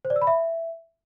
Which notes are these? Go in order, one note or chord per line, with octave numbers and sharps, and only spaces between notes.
C5
D5
E6
B5
E5